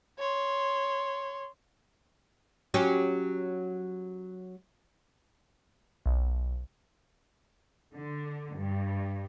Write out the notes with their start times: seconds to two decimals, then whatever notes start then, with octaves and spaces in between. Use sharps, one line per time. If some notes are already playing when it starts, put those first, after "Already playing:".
0.19 C#5 C6
2.74 F#3 C#4 G4
6.06 B1
7.94 D3
8.56 G2